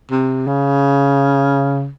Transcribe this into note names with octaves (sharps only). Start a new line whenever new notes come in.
C3
C#3